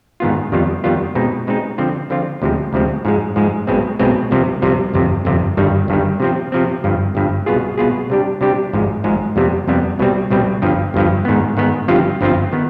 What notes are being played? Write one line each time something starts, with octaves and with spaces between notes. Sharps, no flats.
G#2 D#3 B3 F4
F2 D#3 G3 B3 F4
F2 D#3 G3 B3 F4
B2 G#3 C4 D#4
B2 G#3 C4 D#4
D3 F3 C4 F4
D3 F3 C4 F4
D2 C3 F3 G#3 C4
D2 C3 F3 G#3 C4
G#2 F3 G#3
G#2 F3 G#3
B1 B2 G#3 C4
B1 B2 G#3 C4
C2 C3 F3
C2 C3 F3
G1 F2 C3
G1 F2 C3
G1 G2 D#3 G3
G1 G2 D#3 G3
C3 F3 C4
C3 F3 C4
G1 G2 F3
G1 G2 F3
C2 B2 B3 F4 G#4
C2 B2 B3 F4 G#4
C3 G3 D4 G4
C3 G3 D4 G4
G#1 G#2 F3 G#3
G#1 G#2 F3 G#3
F2 C3 G3 B3
F2 C3 G3 B3
C2 B2 G3 C4
C2 B2 G3 C4
G1 G2 F3
G1 G2 F3
G#2 D#3 B3
G#2 D#3 B3
G1 G2 F3 C4 F4
G1 G2 F3 C4 F4
D#3 B3